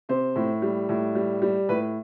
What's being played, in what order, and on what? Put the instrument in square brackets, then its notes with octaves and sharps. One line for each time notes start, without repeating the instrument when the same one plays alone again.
[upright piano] C3 C5
A2
G3
A2
G3
G3
A2 B4